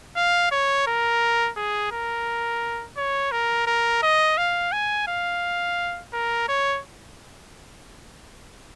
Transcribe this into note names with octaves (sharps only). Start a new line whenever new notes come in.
F5
C#5
A#4
G#4
A#4
C#5
A#4
A#4
D#5
F5
G#5
F5
A#4
C#5